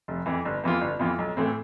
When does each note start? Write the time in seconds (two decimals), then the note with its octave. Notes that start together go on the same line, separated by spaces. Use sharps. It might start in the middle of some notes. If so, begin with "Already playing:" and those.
0.08 F1
0.26 F2 E3
0.45 G1
0.64 F2 E3 B3 F4
0.81 G1
0.99 F2 E3 B3 F4
1.19 B1
1.37 A2 E3 A3 C4